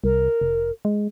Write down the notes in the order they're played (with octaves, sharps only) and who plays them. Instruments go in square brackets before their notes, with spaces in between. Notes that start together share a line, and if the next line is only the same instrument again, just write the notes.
[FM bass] C2 [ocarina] A#4
[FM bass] F1
G#3